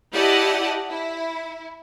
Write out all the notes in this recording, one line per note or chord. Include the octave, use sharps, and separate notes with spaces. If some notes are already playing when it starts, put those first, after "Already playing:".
E4 G4 D5 D#5 F#5 A5
E4